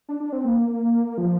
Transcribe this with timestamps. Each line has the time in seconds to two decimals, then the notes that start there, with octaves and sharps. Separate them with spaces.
0.09 D4
0.20 D4
0.32 C4
0.45 A#3
1.18 F3